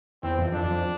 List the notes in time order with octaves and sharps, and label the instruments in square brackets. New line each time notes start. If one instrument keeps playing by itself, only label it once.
[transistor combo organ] E2 [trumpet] C4
[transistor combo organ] F2
[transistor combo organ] F2 [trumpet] D4
[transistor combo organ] F2